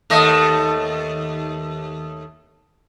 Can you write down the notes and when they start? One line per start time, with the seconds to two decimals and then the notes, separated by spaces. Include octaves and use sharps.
0.10 D#2 A3 D#5